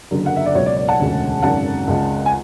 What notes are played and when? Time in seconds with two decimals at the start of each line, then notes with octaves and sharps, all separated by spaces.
0.11 F#1 F#2 D3
0.26 F#5
0.36 E5
0.46 D5
0.55 C#2 B2 F#3 C#5
0.66 D5
0.77 D5
0.88 F#5 A5
0.99 E1 D2 C#3 G#3
1.42 G#1 F#2 C#3 F#5 A5
1.87 C#2 C#3 G#3
2.26 G#5